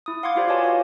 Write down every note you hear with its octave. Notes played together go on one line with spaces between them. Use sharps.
E4 D#6
F5 F#5 C6 D6 G#6
E4 F4 G4 C5 D5
F#4 B4 C#5 D#5 G#5 A5
F5